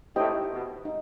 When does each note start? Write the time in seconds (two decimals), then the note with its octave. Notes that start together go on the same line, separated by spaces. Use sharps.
0.16 A2 D#4 G4 C5 D#5 G5
0.51 B2
0.85 D#4